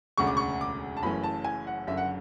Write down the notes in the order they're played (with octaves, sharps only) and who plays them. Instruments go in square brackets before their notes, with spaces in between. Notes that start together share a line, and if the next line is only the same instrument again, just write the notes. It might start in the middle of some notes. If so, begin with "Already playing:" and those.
[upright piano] E1 D2 C#3 C#6
D6
C#6
D6
A5
F#1 F#2 E3 A3 C#4 B5
A5
G#5
F#5
F#1 F#2 D3 E5
F#5